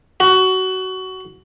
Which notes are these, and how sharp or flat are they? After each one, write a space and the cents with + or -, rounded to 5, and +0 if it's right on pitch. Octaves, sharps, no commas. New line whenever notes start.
F#4 +20